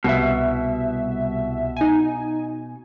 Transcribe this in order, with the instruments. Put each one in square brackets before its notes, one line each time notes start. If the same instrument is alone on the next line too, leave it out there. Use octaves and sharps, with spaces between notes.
[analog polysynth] C2 E5 [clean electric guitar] B2
[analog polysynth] D#4 G#5